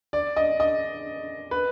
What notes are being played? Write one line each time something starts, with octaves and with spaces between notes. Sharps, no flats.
D5
D#5
D#5
B4